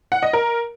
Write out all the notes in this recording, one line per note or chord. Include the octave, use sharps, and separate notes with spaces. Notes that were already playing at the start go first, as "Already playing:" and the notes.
F#5
D#5
A#4